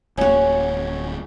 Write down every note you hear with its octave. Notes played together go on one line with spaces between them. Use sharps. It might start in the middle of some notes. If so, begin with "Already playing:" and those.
D1 A#3 C#4 F#4